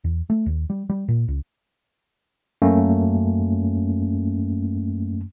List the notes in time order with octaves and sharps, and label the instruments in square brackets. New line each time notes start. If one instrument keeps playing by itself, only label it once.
[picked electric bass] E2
A3
D#2
G3
G3
A#2
C#2
[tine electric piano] F#2 A3 A#3 C#4